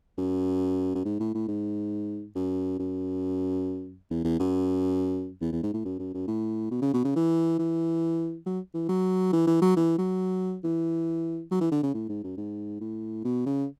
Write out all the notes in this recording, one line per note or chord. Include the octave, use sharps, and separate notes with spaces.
F#2
F#2
G#2
A2
A2
G#2
F#2
F#2
E2
E2
F#2
E2
E2
G#2
A2
F#2
F#2
F#2
A2
B2
C#3
B2
C#3
E3
E3
F#3
E3
F#3
E3
E3
F#3
E3
F#3
E3
F#3
E3
D3
C#3
A2
G#2
F#2
G#2
A2
B2
C#3